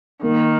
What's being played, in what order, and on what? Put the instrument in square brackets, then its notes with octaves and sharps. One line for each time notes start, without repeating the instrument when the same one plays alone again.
[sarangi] D#3 [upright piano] A#3